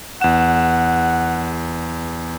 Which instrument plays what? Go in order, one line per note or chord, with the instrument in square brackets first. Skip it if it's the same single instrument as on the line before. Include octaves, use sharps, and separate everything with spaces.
[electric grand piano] E2 E7 [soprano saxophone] F#5